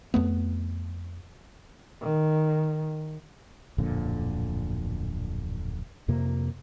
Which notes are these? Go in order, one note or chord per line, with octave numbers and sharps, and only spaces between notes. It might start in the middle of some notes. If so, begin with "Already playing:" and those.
F2 A3 B3
D#3
D1 F2 A#2 D3
F2 C3 A#3